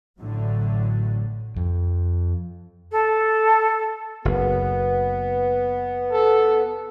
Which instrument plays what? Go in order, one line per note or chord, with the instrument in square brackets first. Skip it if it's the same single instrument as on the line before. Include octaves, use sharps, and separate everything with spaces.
[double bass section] A1 A2 D3 F#3 A3
[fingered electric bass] F2
[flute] A4
[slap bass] F#1 [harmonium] B3
[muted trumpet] A4